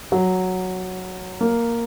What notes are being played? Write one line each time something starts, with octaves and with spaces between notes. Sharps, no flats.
F#3
A#3